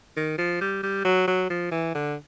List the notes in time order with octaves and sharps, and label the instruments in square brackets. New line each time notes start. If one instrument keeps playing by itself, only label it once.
[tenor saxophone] D#3
F3
G3
G3
F#3
F#3
F3
E3
D3